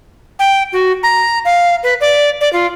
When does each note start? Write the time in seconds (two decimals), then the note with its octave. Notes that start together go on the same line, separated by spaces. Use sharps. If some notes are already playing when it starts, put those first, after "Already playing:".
0.39 G5
0.73 F#4
1.03 A#5
1.45 F5
1.83 B4
2.01 D5
2.41 D5
2.53 F4